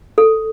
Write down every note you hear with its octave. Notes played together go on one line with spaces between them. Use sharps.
A4